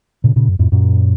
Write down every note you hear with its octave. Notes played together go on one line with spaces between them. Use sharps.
A#2 C#3
A#2 C#3
F#2
F2 A2
F#2 A#2